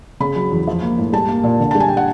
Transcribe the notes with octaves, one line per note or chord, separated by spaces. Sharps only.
C#3 B5
F#3
E2
F3
A#3
A2
G3 A5
A#3
A#2
D3
A5
G3
G#5
G5
F#5